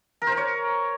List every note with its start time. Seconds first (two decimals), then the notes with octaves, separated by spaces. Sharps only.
0.22 A#4
0.27 C5
0.32 A#4
0.37 C#5